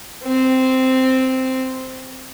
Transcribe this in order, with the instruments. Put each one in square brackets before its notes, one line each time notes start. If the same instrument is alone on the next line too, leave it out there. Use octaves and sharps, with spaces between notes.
[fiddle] C4